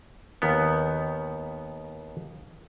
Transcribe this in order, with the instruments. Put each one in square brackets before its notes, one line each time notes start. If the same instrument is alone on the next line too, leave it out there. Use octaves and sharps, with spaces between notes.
[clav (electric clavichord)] D#2 D#3 B3